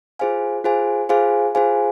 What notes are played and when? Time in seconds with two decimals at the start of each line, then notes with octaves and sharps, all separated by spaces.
0.19 F4 G#4 C5 F5 G#5
0.64 F4 G#4 C5 F5 G#5
1.09 F4 G#4 C5 F5 G#5
1.55 F4 G#4 C5 F5 G#5